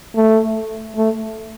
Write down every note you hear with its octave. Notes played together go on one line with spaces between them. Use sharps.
A3
A3